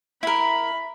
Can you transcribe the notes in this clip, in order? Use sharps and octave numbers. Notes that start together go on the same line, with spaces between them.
E4 A#4 B5